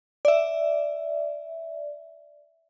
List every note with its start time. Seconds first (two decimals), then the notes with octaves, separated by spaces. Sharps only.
0.25 D5 E5